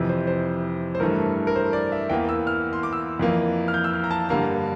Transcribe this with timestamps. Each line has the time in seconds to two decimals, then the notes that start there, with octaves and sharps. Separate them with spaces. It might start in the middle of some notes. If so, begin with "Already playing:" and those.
Already playing: F2 C3 E3
0.09 C5
0.27 C5
0.95 C5
1.00 G2 E3 A3 A#4
1.47 A#4
1.56 C5
1.73 D5
1.92 E5
2.10 E2 E3 A#3 G5
2.29 E6
2.47 F6
2.73 C6
2.83 D6
2.93 E6
3.19 F2 E3 A#3
3.68 F6
3.74 G6
3.84 E6
3.94 F6
4.04 A#5
4.11 A5
4.29 G2 D3 G3 A#3 A#5